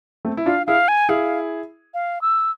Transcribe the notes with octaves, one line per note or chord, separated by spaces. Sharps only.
A3 C4
E4
D4 F4 F5
E4 G#4 F5
G#5
E4 G#4 F5
F5
E6